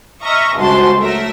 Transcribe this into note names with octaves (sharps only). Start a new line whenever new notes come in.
D#5 E5 A#5 C#6 F6
G1 C#2 F#4 C5 A5 C6
F#3 A3 A#4 E5